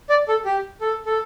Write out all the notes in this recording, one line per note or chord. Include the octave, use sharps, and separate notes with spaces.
D5
A4
G4
A4
A4